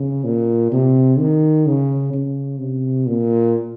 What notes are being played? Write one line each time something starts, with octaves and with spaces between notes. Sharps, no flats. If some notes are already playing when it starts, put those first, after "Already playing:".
Already playing: C#3
A#2
C3
D#3
C#3
C#3
C3
A#2